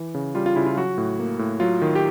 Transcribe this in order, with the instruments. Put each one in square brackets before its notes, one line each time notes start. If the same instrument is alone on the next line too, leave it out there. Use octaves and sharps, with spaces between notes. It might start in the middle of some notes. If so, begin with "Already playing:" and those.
Already playing: [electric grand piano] E3
C#3
G3 F4
F4
C#3 E4
F4
F#3 F#4
A2
A#3
A2
F#3 F4
D#3
G4